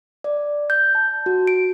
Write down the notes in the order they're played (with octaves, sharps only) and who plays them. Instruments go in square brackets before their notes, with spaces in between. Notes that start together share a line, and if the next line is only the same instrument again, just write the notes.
[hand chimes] D5
G6
A5
F#4
D7